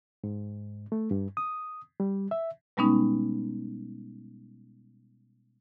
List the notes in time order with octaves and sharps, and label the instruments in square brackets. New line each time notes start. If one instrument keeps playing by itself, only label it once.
[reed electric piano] G#2
A3
G2
D#6
G3
E5
[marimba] B2 G3 G#3 B3 C#4 D#4